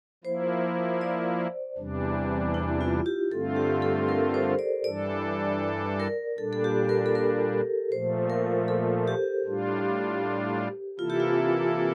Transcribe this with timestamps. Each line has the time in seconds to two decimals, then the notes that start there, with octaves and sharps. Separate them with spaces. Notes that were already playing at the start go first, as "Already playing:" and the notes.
0.24 F3 A#3 E4 C5
1.01 D5
1.78 E2 C3 E3 G3 D4
2.54 E4
2.81 F4
3.06 G4
3.31 G2 D3 A3 C4 F4 A4
3.56 G4
3.82 A4
4.09 A#4
4.34 C5
4.59 D5
4.84 G2 E3 G3 D4 A4 D5
6.00 A#4
6.38 A#2 G3 D4 A4
6.53 A4
6.64 G4
6.89 A#4
7.06 A4
7.15 A#4
7.92 A#2 F3 A3 C5
8.30 A#4
8.68 A4
9.08 G4
9.45 A2 G3 D4 F4
10.99 C3 E3 A#3 E4 F4 A4
11.10 G4
11.20 F4